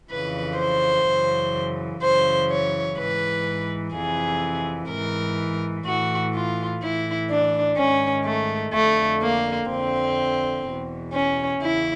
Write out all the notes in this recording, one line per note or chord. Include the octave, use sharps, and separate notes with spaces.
F2 C#3 E3 B4
C5
F#2 C#3 E3
F#2 C#3 E3 C5
C#5
G#2 E3 B4
F2 C3 E3 G#4
G#2 E3 A#4
A2 E3 F#4
F4
A2 E3 E4
D4
G#2 D#3 C#4
A3
F2 D3 A3
A#3
F2 D3 C4
E2 B2
C#4
E2 C#3 E4